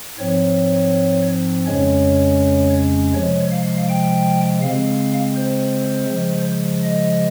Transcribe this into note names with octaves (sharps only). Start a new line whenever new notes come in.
G#2 F3 C4 C#5
F2 C#3 G#3 C#4 C#5
C3 F3 G#3 C#5
F5
G5
C#3 G#3 C4 F5
C5
C#3 F3 G#3
D#5